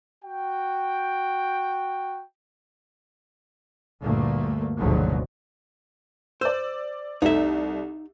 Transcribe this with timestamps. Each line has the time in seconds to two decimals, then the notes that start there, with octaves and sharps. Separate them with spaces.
0.25 F#4 G5
4.02 D2 G2 A#2 A3 A#3
4.77 F#1 D2 G#2 B2 F3 F#3
6.41 C5 D5 E6
7.22 C2 A3 D#4 E5